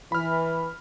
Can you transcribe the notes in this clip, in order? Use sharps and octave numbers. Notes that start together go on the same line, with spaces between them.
E3 B5 F6